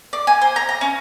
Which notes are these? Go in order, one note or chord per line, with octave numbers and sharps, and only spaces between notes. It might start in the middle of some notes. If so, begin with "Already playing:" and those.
D5
G#5
C5
A#5
A#5
C#4